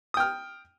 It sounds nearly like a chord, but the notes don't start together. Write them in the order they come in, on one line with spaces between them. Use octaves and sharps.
D#6 G5 F6